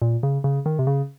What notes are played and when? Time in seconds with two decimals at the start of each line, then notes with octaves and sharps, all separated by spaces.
0.02 A#2
0.23 C#3
0.44 C#3
0.66 D#3
0.79 C3
0.87 C#3